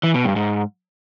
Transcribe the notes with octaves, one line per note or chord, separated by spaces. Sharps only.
E3
B2
G2
G#2